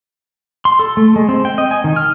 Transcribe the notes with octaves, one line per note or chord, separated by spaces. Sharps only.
C6
A4
A3
G#3
C4
G5
D#5
G#5
D#3
F6